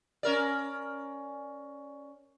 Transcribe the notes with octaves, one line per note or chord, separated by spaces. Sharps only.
C#4 A#4 D5